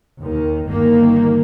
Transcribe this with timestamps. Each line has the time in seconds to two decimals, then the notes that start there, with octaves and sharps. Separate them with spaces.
0.21 D#2 D#3
0.68 G1 D#3 A#3